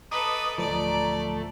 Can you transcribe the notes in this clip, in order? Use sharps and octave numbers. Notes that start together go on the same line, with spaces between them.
A4 B4 D#5 A#5 D6 D#6
D1 F3 A3 D5